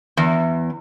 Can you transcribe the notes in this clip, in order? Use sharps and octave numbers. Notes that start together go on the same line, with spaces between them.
E2